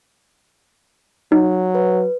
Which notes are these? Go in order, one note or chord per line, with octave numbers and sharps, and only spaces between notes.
F#3 D#4
B4